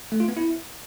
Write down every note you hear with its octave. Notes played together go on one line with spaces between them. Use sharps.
A3
F4
B3
E4